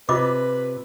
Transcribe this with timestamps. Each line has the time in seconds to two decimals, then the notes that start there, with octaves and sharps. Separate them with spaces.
0.09 C3 F4 B4 D#5 D6